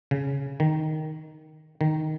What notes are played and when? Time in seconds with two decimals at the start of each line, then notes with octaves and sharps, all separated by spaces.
0.11 C#3
0.60 D#3
1.81 D#3